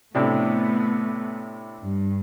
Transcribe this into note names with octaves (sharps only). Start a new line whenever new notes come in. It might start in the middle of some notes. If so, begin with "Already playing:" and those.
A2 C3 A3 B3 D4
G2